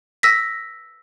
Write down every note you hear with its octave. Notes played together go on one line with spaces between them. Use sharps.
E6 A#6 B6